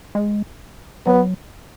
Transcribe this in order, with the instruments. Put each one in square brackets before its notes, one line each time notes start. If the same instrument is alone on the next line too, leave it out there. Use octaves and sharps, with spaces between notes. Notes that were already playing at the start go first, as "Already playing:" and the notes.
[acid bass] G#3
[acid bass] F#3 [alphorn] B3